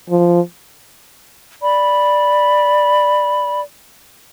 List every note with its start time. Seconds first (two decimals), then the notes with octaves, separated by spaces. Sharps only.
0.10 F3
1.62 D5 B5